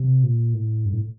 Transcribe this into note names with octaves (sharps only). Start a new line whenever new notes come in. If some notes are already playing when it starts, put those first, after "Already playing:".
Already playing: C3
A#2
A2
G2
A2